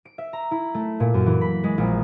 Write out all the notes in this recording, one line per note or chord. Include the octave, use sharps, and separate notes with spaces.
D7
E5
A#5
E4
A3
A#2
F#2
E3
B5
G#3
A#1